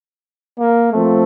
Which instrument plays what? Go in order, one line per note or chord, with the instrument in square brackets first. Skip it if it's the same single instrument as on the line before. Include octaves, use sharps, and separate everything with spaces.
[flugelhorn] A#3
[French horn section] F3 C4 [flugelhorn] A3